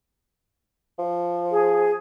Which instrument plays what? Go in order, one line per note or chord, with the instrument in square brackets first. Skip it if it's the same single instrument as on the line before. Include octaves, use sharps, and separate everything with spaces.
[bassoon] F3
[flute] G#4